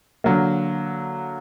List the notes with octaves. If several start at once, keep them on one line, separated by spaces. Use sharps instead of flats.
D3 F#3 A#3